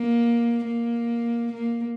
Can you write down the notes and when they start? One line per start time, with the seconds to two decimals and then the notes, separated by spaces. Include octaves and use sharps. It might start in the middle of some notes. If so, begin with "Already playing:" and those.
Already playing: A#3
0.65 A#3
1.53 A#3